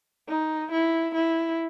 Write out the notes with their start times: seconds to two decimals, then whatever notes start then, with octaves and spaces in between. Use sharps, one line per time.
0.29 D#4
0.72 E4
1.15 E4